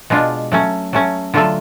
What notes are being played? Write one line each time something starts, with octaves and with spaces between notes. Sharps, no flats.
B2 G#3 D4 F4
F#3 A3 C#4
F#3 A3 C#4
D3 F#3 A3 F4 A4